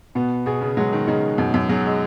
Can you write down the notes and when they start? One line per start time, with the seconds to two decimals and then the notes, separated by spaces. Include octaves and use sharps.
0.15 B2 B3
0.46 B2 G#4
0.61 C#3
0.77 F#3 G#3
0.93 D#3
1.07 C#3 D#4
1.38 F#2 B2
1.54 F#2
1.69 F#3 G#4
1.85 G#3